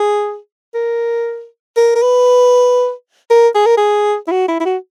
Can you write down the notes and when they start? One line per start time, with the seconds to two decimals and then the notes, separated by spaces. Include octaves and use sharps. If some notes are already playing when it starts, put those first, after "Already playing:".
Already playing: G#4
0.75 A#4
1.77 A#4
1.95 A#4
2.02 B4
3.30 A#4
3.55 G#4
3.66 A#4
3.78 G#4
4.28 E4
4.31 F#4
4.48 E4
4.60 E4
4.65 F#4